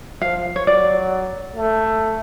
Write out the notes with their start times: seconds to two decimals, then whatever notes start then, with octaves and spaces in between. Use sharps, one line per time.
0.22 F3 F5
0.56 C#5
0.66 F#3 D5
1.56 A3